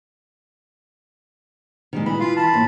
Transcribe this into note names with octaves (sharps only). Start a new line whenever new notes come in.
D#3 G3 G#3
E3 B5
F4 F5
A5 B5
A2 A#3